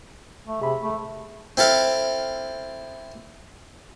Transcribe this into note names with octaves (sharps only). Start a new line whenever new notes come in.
A3
C3 G#4 E5 B5
A3
C4 E4 A4 F5